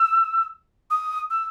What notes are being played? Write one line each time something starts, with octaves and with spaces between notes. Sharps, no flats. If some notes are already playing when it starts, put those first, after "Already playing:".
Already playing: E6
D#6
E6